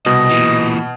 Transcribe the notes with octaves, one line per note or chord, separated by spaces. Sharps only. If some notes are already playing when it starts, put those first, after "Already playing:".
C2 B2 D#5
A#2 E3